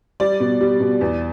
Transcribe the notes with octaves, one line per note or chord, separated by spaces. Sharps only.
G3 D5
B2
G3
B2
E2